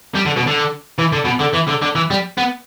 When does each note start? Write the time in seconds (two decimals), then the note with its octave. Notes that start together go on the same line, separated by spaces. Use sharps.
0.15 G3
0.25 D3
0.36 B2
0.47 D3
0.99 E3
1.13 D3
1.26 B2
1.41 D3
1.54 E3
1.68 D3
1.82 D3
1.95 E3
2.11 G3
2.38 B3